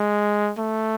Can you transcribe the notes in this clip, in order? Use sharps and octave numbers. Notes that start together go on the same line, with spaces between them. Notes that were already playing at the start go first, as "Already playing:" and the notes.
Already playing: G#3
A3